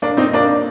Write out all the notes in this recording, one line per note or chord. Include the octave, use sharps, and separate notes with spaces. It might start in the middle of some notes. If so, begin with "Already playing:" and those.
A#3 D4
C4 D#4
A#3 D4